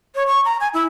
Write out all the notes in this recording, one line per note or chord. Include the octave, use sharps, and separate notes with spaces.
C#5
C#6
A#5
G#5
E4